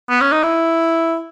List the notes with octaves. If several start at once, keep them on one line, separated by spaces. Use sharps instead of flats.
B3
C#4
D#4
E4